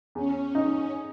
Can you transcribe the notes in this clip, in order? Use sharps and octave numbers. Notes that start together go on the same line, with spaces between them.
E2 C#4
D#4